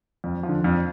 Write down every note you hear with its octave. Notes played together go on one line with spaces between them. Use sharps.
F2
F3
D3
F2